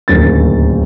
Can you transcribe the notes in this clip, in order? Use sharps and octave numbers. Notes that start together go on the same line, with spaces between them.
D1 D#2 C#3 A#3 A6